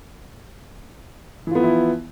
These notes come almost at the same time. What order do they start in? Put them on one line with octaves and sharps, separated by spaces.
E3 F4 B3 F3 E4